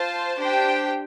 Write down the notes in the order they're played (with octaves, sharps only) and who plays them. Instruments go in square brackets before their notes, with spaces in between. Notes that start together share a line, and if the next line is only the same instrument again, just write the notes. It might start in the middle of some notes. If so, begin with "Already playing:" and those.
Already playing: [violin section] F4 C5 A5
D4 G4 C5 G5